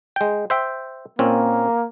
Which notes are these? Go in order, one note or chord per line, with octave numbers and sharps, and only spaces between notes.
G#3 G5
C5 E5 G5
A#2 A#3 C4 C#4